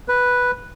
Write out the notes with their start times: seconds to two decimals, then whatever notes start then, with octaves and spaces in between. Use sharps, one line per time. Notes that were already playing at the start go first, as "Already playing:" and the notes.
0.08 B4